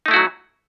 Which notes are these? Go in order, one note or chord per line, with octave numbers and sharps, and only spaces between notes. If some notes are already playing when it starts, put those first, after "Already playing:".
F#3 A3 D#4 E4 F#4